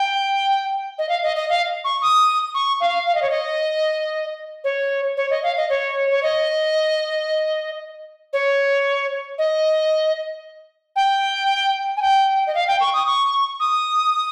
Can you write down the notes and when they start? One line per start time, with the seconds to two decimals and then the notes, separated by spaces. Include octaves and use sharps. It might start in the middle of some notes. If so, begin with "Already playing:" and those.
Already playing: G5
0.98 D#5
1.09 F5
1.23 D#5
1.36 D#5
1.49 F5
1.84 C#6
2.02 D#6
2.54 C#6
2.81 F5
3.07 F5
3.15 D#5
3.22 C#5
3.30 D#5
4.64 C#5
5.17 C#5
5.30 D#5
5.43 F5
5.57 D#5
5.70 C#5
6.11 C#5
6.23 D#5
8.33 C#5
9.38 D#5
10.96 G5
11.97 G#5
12.02 G5
12.47 D#5
12.55 F5
12.68 G5
12.81 C#6
12.94 D#6
13.07 C#6
13.60 D#6